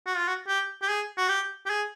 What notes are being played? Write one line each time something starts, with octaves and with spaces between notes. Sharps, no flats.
F#4
F4
F#4
G4
G4
G#4
F#4
G4
G4
G#4